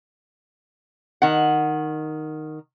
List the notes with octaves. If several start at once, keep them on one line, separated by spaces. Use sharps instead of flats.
D#3 F#5